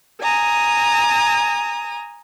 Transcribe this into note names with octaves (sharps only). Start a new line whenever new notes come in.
G#5 A#5 D#6